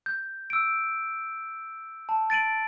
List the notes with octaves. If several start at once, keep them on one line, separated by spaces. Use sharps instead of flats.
G6
E6 D7
A5
A6 D7 D#7 F#7